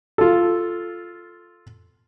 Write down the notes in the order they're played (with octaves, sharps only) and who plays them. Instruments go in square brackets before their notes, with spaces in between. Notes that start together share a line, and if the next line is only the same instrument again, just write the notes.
[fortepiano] F4 A4